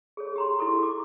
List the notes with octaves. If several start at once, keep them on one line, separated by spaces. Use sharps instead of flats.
G#4 A4 C#5
G4 A#5 C6
E4 G4 A4 C#6
D6